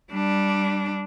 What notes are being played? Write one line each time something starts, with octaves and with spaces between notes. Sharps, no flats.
G3 D4